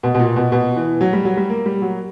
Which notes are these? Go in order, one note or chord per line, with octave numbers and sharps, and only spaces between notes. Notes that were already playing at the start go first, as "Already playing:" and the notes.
B2
B2
A#2
B2
B2
E3
F#3
G3
F#3
G3
A#3
G3
F#3